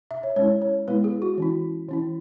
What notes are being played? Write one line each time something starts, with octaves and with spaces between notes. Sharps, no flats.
E5
C#5
G#3 C#4 E4 C#5
C#5
G#3 B3 E4 B4
G#4
F#4
E3 C#4 E4
E3 C#4 E4